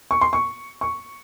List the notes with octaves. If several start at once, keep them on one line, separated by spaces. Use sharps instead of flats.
C#6
C6
C#6
C#6